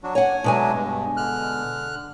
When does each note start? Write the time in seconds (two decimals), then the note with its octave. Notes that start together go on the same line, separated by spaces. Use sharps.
0.03 F#3 D4 F#4
0.15 C#5 F#5 G#5
0.44 B2 F#3 G#3 A3 D4 G#5
0.74 G2
1.17 D3 F6 F#6